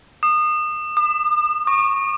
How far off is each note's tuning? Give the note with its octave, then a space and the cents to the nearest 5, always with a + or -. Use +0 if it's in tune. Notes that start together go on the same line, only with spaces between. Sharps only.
D#6 -30
D6 +45
C#6 -10